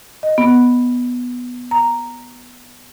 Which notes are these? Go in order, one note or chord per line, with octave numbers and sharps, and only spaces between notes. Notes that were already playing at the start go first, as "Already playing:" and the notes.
D#5
B3
A#5